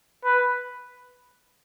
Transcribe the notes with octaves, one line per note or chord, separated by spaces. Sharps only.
B4